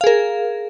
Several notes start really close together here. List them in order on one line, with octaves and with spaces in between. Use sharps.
F5 G#4 A#4